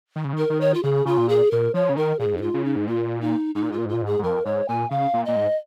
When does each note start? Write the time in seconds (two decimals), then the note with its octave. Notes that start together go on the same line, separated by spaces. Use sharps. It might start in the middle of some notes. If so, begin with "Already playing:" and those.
0.16 D#3
0.25 C#3
0.33 D#3 A#4
0.50 D#3
0.61 C#5
0.74 F4
0.83 C#3 G#4
1.05 C#3 F4
1.18 A#2
1.29 G#4
1.51 A#2 A#4
1.74 F3 C#5
1.89 C#3
1.97 D#3 A#4
2.19 A#2 G#4
2.26 G#2
2.33 F2
2.37 D#4
2.40 G#2 F4
2.54 C#3
2.65 D#4
2.76 G#2
2.87 A#2 F4
3.21 D#4
3.55 G#2 D#4
3.63 A#2
3.70 G#2 F4
3.78 A#2
3.86 G#2
3.89 A#2 F4
4.02 G#2 G#4
4.19 G#2
4.23 F2 A#4
4.45 G#2 C#5
4.68 A#2 G#5
4.91 C#3 F5
5.14 A#2
5.25 A#2 D#5
5.36 G#2